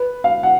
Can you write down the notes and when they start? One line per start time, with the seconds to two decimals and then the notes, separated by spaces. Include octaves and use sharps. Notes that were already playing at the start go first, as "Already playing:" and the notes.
Already playing: B4
0.24 F5
0.43 F#5